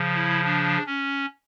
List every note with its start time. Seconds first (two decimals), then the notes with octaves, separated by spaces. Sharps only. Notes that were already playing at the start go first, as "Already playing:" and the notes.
Already playing: C#3 F3
0.15 E4
0.44 D4
0.87 C#4